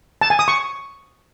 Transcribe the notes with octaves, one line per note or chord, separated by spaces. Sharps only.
A5
G#5
D#6
C#6